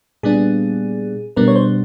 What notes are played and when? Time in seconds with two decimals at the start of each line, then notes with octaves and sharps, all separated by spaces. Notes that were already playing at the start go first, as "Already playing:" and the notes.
0.23 A#2 G3 B3 D4 G#4
1.36 B2 G3 B3 D4 A#4
1.48 C#5
1.56 C5